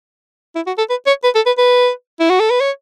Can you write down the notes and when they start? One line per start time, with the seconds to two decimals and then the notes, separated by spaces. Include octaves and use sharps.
0.56 E4
0.67 F#4
0.78 A4
0.90 B4
1.07 C#5
1.24 B4
1.35 A4
1.46 B4
1.58 B4
2.20 E4
2.30 F#4
2.40 A4
2.50 B4
2.60 C#5